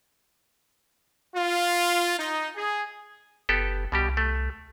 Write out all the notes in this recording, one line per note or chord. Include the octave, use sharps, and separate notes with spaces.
F4
D#4
G#4
F#1 B3 G4 A4
C2 B2 G3 G4
A3